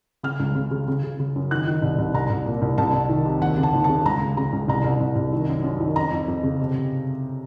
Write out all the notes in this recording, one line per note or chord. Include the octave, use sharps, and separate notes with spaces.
C#3 F6
C#2
C#3
C#3
C#3
C#3
C#3
F#2
D#3 F#6
D#3
C2
C2
C2 A#5
C2
A#2
C2
C2 A5
C2
D#3
C3
D#2 F#5
C#3
A5
D#2
A5
C#3
C#2 A#5
C#2
C#3 A#5
C#2
C2 A#5
C2
C2
C2
D#3
F#2
F#2
D#3
F2 A#5
F2
F2
C#3
C3
C3